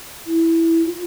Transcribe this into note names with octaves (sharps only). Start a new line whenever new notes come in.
E4
F4